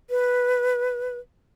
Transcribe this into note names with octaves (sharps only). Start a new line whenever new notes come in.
B4